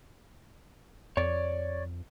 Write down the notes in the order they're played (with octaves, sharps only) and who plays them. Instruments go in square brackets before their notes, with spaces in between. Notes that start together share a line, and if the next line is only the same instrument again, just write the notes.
[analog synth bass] F2 [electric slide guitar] C#5 D5